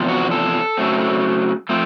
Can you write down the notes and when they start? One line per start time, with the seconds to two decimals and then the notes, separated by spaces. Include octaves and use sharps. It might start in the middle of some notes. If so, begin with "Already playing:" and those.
Already playing: E2 C3 F3
0.08 F#4
0.31 A4
0.77 C#3 F#3 A3 C4
1.69 F3 A3 C4